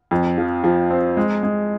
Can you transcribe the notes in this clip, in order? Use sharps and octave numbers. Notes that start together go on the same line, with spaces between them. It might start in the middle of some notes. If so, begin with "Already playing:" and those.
F2
F3
F3
C4
G#3
G#3